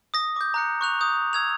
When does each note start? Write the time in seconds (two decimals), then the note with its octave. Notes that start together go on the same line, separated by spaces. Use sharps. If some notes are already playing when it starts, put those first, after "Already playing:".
0.14 D#6 A#6
0.36 D6 G6
0.54 A#5 F#6 C#7
0.81 C#6 F#6 F7
1.01 D#6 G6
1.33 E6 G#6 F7